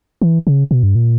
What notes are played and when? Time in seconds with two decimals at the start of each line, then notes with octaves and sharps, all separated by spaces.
0.22 E3
0.47 C#3
0.71 B2
0.83 G2
0.95 A#2